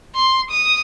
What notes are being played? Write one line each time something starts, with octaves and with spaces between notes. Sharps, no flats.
C6
D#6